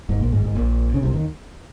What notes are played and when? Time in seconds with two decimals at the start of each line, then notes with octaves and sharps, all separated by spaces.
0.09 G#1 G#2
0.20 A#1 A#2
0.32 G#1 G#2
0.44 G#1 G#2
0.55 A#1 A#2
0.94 C#3
1.02 C2 C3
1.14 D#2 D#3